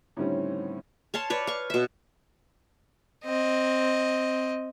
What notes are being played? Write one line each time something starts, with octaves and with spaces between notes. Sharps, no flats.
A2 D3 D#3 G3 C4 C#4
C#5 F5 A5 C6
B4 C#5 D5
F5 C#6
B2 E5
C4 D#5